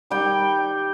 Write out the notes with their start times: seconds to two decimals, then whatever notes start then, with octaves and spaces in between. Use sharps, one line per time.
0.10 D#3 G3 G5